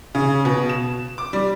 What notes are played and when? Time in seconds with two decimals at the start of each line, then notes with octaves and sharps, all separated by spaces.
0.15 C#3
0.45 B2
0.69 E7
1.18 D6
1.33 G3